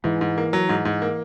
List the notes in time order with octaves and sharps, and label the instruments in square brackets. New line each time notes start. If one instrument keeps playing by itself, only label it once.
[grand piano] G#2 [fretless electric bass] E3
[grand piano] G#2
A#3
F#3
G#2
G#2
A#3